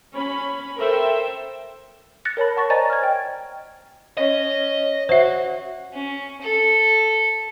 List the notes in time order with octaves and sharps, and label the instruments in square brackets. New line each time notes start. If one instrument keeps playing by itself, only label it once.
[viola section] C#4 B5
A4 A#4 C5 E5 G5
[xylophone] F#6 A6 A#6 C#7
A#4 C#5 A5 B5
F#5 A5 C#6 A6 A#6
C5 D5 D#5 G#5 A#5 A6
F6 G#6
D#5 G5
[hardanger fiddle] C#4 [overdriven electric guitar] D#5
[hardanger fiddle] F#4 [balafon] C5 E5
[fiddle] C#4
A4